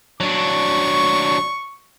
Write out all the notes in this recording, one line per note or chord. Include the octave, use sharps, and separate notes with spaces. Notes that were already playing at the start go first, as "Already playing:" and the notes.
F#3 D4 C#6